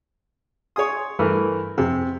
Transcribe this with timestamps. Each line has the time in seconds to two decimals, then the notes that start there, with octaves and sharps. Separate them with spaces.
0.76 G#4 C#5 G#5 C6 D#6
1.19 G2 E3 A3 A#4
1.78 F2 C3 G#4